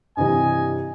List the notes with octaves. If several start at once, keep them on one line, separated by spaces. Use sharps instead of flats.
G2 C3 E3 D#5 G#5